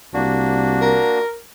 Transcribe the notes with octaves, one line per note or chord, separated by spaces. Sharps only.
C2 A#3 D4 F#4
A#4